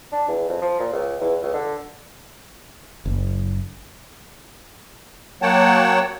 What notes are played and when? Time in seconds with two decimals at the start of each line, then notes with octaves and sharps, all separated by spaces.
0.12 D4
0.28 E2
0.49 F2
0.62 F3
0.80 A#2
0.93 C#2
1.20 E2
1.42 C#2
1.54 D3
3.05 F#1
5.42 F#3 A#3 C#5 F#5 G5 A5